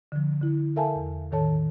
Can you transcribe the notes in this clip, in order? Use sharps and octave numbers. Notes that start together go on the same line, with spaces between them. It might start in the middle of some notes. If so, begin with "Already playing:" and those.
D3 F3
D3 E4
A4 A#4 E5 F5 G#5 A5
E2
A2 D#3 A4 C#5 A5